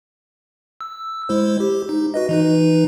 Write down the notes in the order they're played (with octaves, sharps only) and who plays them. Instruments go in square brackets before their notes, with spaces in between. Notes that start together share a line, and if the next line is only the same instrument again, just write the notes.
[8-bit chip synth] E6
G#3 E4 C5
G4
D#4
F#4 B4 D#5
E3 D#4 B4